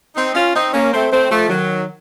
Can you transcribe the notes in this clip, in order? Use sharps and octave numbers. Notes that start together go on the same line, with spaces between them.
C4 D#4
C#4 F4
C4 D#4
A#3 C#4
A3 C4
A3 C4
F3 A3
D#3 F#3